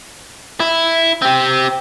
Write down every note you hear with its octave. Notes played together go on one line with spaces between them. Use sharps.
E4
C4 G4